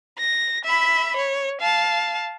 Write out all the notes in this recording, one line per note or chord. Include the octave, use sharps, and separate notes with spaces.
A#6
E5 B5
C#5
F5 A5